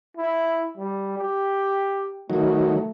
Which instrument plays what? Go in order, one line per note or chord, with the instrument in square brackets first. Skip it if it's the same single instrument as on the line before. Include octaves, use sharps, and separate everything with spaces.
[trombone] E4
G3
G4
[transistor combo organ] D#3 F#3 [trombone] A3